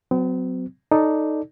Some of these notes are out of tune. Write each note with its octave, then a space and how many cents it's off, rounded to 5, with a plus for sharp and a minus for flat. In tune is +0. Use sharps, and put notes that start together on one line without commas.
F#3 +0 C4 -45
D#4 +0 A4 +0 D5 -5